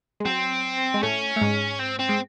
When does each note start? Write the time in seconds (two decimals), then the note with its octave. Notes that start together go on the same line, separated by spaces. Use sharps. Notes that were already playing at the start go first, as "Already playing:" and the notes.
0.20 G#3
0.26 F#3 C4
0.94 G#3
1.02 A2 A3 C#4
1.36 A3
1.41 G#2 G#3
1.80 C4
1.99 C4
2.09 G#3